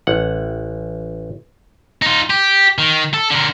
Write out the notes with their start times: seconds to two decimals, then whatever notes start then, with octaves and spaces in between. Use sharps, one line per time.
0.07 A1 F#5
2.02 D#4 F4
2.30 G4
2.78 D#3
3.14 A4
3.31 D3 A#4